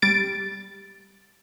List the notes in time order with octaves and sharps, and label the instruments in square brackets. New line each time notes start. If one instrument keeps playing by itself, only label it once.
[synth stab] G3 A6 D7